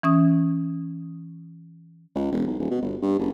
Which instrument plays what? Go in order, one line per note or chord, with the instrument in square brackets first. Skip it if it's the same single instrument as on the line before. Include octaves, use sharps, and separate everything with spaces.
[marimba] E3 C#4 D#6
[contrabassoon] C#2
E1
B1
D#1
B2
G1
G2
F#1